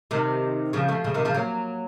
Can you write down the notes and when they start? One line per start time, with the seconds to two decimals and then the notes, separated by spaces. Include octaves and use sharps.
0.11 C3 D#3
0.73 C#3 F3
0.88 F3 A3
1.04 C#3 F3
1.14 C3 D#3
1.25 C#3 F3
1.34 F#3 A#3